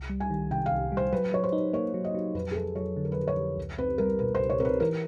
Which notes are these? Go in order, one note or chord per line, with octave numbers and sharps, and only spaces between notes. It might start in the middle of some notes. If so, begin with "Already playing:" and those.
Already playing: C2
G3
G#5
D#3
C3 G5
F5
C2
G3
C5
F#3 B4
F#3 C#5
C5
D#4
A#3 C#5
F#3
D#5
F#3
F2 B4
G#4
F2 A4
F#3 C#5
D3
A#4
B4
F2
C#5
F2
C#2
C4 B4
G3 A#4
B2 B4
C5
C#2
C#5
C4 A#4
B4
E3 A#4